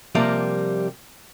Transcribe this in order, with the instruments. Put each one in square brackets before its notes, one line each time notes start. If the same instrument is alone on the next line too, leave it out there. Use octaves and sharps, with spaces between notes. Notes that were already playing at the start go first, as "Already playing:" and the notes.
[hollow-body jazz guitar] C3 F3 G3 A#3